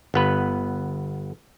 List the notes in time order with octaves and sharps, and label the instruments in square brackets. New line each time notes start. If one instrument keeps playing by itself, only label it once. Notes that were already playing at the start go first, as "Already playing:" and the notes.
[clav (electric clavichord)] G1 B3 B4